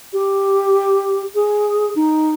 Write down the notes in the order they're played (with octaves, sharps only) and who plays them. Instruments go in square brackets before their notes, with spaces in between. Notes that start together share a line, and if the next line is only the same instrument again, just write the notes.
[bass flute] G4
G#4
D#4